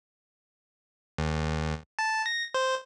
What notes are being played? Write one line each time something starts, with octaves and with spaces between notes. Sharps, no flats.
D#2
A5
A#6
C5